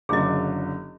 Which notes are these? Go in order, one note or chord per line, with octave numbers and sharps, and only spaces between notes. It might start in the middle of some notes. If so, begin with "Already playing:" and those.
F#1 D3 F#3 G#4 D#5